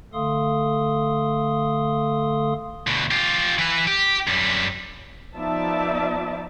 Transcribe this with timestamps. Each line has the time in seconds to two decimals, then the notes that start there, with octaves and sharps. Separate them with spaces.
0.13 D3 A3 A4 F5 C6 D#6
2.87 D2 B2
3.11 F4 G4
3.58 E3 B4
3.87 G4
4.27 F#2 G3
5.36 F3 B3 D#4 D5 E5 A5